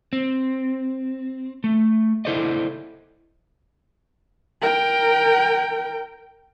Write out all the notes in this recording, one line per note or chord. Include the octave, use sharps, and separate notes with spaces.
C4
A3
E4 F4 A4 C5 D5 D#5
A#4 G5